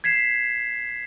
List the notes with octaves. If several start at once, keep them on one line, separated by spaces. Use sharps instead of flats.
G#6 B6 C7 E7